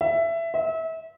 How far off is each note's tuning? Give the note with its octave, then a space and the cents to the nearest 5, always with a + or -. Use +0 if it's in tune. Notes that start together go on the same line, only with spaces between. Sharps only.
E5 +15
E5 -30